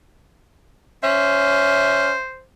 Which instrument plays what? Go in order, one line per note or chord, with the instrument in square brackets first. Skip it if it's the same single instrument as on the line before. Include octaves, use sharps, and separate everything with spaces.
[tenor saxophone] C#4 [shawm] C5 [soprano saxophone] E5